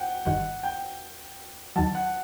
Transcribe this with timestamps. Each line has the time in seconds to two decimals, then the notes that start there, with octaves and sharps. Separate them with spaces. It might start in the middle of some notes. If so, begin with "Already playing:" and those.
Already playing: F#5 G5
0.25 G1 G2 D#3 F#5
0.63 G5
1.76 D#2 D#3 F#3 A5
1.95 F#5